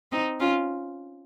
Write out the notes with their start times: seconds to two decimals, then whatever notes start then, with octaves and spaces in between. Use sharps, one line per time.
0.12 C4 D#4
0.40 C#4 F4